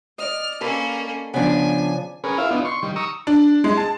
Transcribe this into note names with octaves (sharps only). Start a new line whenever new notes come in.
D5 D#5 F6
A#3 C#4 A4 B4
C#3 F3 B3 D4 G#5
C#4 G#4 A#4 B4
E4 F4 E5 F5
B3 D4 D#4 F4
C6 C#6
D#3 G3
A#5 C#6 D#6 E6
D4
G#3
A5